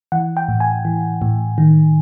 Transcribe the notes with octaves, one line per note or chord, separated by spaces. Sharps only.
E3 F#5
G5
A2
G#5
E3
A2
D#3